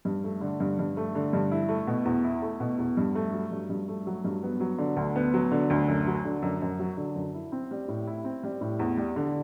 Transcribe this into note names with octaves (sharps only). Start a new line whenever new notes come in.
G2
A3
D3
G2
G2
A3
D3
G2
E4
A3
B2
E2
E4
A3
B2
E2
G2
A3
F#3
G2
G2
A3
F#3
G2
B3
F#3
D3
D2
B3
F#3
D3
D2
F#2
F#3
D3
F#2
F#2
F#3
D3
F#2
E4
C4
G3
A2
E4
C4
G3
A2
E2
G3
D3